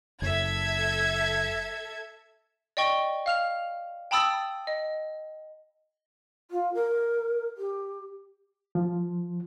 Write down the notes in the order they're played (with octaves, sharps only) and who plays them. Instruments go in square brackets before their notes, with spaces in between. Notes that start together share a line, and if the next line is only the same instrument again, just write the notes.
[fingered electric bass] F#1 F#2 [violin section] A4 E5 G#6
[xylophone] D5 D#5 G5 C#6 G7
F5 F6 F7
G5 A5 B5 D#6 E6 A6
D#5
[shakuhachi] F4
A#4
G4
[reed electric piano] F3